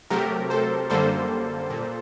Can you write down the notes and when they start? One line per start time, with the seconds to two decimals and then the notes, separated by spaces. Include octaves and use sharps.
0.10 C3 F#3 A3 G4 A#4
0.50 A4 C5
0.90 F#2 D3 G3 A#3 A4 C5
1.70 A#2